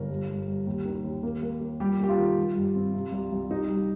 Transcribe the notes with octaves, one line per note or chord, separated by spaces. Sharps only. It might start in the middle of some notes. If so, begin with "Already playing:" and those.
Already playing: G1 A#4
G2
G2
G2
D#2
D#3
D#2
A#3
A#3
A#3
F2 G3 G4
A#3 G4
F4
D#3
G3
G2
C4
C3
C2
C2
C2 D#4
G3